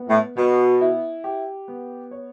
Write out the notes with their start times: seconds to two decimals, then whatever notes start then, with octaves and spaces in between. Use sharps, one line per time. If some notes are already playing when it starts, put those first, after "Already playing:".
Already playing: B3
0.08 A2
0.36 B2 B3
0.81 E4
1.24 G4
1.68 B3
2.11 C#5